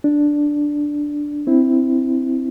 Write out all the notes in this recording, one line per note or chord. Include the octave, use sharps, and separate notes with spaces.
D4
C4 E4